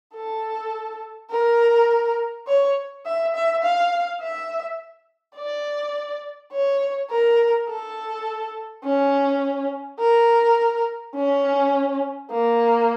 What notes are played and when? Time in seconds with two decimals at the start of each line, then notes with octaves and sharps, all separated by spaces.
0.15 A4
1.31 A#4
2.47 C#5
3.06 E5
3.35 E5
3.63 F5
4.21 E5
5.36 D5
6.52 C#5
7.10 A#4
7.68 A4
8.85 C#4
9.99 A#4
11.15 C#4
12.31 A#3